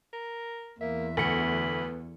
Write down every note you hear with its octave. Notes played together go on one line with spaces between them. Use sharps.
A#4
E2 A#3 E5
D2 B3 B5 C#7